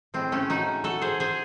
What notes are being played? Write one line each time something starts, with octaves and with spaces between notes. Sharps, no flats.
A2 G#3 C4
A3 C#4
D#4 F#4
F#4 A4
G#4 C5
G#4 C5